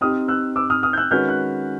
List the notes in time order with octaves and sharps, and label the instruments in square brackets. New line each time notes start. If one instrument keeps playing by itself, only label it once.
[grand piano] C4 D#4 G4 [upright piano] D#6 F6
[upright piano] E6 F#6
D6 E6
D#6 F6
D#6 F6
G6
E6 F#6
[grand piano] D#3 G#3 C#4 F#4 B4 [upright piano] F6 G6
[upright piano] F#6